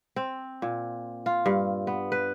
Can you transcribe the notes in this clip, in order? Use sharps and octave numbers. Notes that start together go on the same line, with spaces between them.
C4
A#2
F4
G2
B3
B4